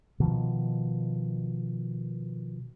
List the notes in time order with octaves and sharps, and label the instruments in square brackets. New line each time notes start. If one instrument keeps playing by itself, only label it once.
[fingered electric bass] B2 D#3 F3